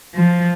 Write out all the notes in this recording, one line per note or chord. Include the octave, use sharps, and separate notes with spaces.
F3